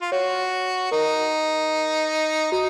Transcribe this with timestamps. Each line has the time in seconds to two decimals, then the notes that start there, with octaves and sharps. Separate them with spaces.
0.01 F4
0.12 F#4 C#5
0.91 D#4 A#4
2.52 D#4 F#4